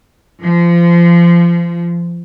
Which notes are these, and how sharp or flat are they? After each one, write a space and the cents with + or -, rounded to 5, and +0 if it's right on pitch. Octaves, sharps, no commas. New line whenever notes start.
F3 -25